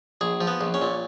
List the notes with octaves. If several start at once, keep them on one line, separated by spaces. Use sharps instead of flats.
A#1 G#4
F3
B3
A#1
C#4
A#2